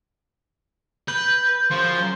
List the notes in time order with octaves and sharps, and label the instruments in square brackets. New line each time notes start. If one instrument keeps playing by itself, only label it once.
[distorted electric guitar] B4 [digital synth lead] G6
[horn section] F#2 C#3 C6 [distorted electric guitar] F3